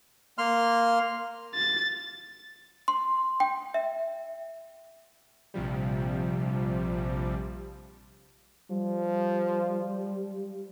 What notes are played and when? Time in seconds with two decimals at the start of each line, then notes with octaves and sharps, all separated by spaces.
0.38 A#3 C6 F6
1.55 A6
2.88 C6
3.40 G5
3.74 E5
5.54 A#1 C3 F3 G3
8.70 F3 G3